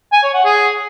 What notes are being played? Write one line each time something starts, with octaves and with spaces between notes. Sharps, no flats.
G#5
C#5
F#5
G#4